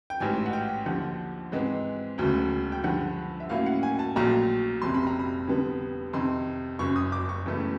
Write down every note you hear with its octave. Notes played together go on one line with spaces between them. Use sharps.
G5
A1 G#2 E3 G#5
F#5
G5
D#2 D3 F3 F#5
G#2 E3 G#3 C4
E1 D2 C#3 F#3 A3
G5
G2 D3 F3 F#5
E5
A2 F#3 A#3 C#4 E4 F5
F#5
G#5
A5
A#1 A#2 F#3 A3 A#5
F1 F2 C3 C6
B5
A#5
B5
F2 D3 G3 B3
F2 C3 D#3 C6
F#1 F#2 C#3 C#6
D#6
D6
C#6
E1 E2 C#3 E3 A3